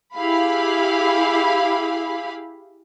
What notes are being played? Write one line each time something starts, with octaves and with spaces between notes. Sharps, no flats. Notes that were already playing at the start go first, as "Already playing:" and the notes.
E4 G4 G#4 F5 B5